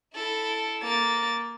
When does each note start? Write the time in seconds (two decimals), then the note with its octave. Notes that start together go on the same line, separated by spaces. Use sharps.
0.14 E4 A4
0.83 A#3 A6